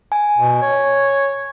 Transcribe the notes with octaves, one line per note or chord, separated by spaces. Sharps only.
G#5
B2
C#5